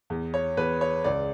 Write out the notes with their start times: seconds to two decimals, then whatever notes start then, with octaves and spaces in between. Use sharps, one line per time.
0.10 E2
0.34 C#5
0.57 E2 B4
0.81 C#5
1.04 C#2 D5